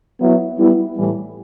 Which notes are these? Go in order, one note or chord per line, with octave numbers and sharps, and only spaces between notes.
F#3 B3 E4
G3 B3 E4
A2 E3 G3